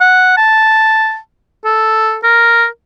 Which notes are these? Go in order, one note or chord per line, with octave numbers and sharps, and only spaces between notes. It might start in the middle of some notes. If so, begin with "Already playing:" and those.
F#5
A5
A4
A#4